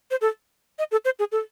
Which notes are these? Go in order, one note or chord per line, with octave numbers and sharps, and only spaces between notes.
C5
A4
D#5
A4
C5
G#4
A4